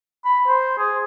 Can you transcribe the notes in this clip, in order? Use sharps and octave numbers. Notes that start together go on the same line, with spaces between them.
B5
C5
G#4